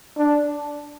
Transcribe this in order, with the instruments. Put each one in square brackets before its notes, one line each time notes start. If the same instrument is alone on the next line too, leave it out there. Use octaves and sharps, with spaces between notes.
[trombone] D4